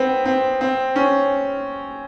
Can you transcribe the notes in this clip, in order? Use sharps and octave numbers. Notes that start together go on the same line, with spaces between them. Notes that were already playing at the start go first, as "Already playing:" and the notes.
Already playing: B3 C4
C4
C4
C#4